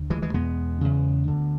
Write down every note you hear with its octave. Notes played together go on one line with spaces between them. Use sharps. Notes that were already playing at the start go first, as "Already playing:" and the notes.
Already playing: D2
E3 G#3
E3 G#3
E2 B2 G#3 B3
E2 C#3
D2 D3